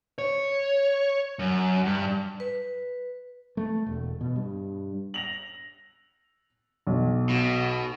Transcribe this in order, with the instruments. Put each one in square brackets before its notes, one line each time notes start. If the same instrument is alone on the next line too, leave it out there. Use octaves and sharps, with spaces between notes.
[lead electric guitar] C#5
F#2
G2
[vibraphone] B4
[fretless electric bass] A3
E1
B2
G2
[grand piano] A#6 F7 F#7
B1
[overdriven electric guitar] B2